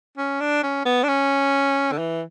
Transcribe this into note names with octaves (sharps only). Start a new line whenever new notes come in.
C#4
D4
C#4
B3
D4
C#4
D3
E3